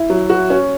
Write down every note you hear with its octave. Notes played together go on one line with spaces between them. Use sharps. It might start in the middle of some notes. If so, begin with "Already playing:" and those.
Already playing: E4
F#3
F#4
C#4